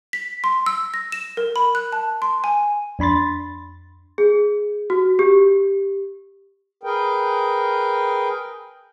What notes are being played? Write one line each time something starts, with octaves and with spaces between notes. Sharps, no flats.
B6
C6
E6
A#6
E7
A#4
B5
F#6
A5
C6
G#5
F2 D4 B5 C6 A6
G#4
F#4
G4
G#4 A#4 B4 G5